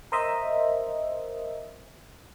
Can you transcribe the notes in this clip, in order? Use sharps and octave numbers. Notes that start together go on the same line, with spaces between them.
A#4 C5 D#5 E5